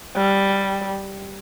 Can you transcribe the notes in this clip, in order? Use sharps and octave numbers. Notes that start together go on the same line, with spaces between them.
G3